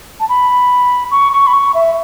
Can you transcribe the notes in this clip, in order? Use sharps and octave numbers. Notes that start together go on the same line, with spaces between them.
A5
B5
C#6
C#6
B5
C#6
E5